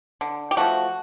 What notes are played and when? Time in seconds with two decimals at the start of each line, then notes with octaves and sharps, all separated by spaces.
0.21 D3
0.51 G4
0.57 F3 A3 F#4